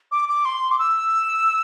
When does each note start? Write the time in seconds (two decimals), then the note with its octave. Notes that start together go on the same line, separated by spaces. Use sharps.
0.12 D6
0.29 D6
0.45 C6
0.71 D6
0.79 E6